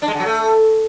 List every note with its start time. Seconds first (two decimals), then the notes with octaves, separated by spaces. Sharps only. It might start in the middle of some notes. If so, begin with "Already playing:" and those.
0.02 D4
0.08 G#3
0.14 D3
0.20 F#3
0.26 A3